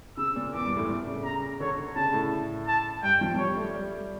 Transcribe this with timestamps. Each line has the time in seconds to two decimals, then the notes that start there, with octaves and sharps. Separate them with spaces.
0.17 C#3 E6
0.36 A#2
0.53 E2 D6
0.65 G2
0.77 A2
0.89 A#2
1.07 C#3
1.25 A#5
1.60 D3 C#5
1.78 D3
1.96 C#3 A5
2.13 A2
2.67 A5
3.03 G2 G5
3.21 F3
3.34 F3
3.38 G3 C#5
3.56 A3
3.74 G3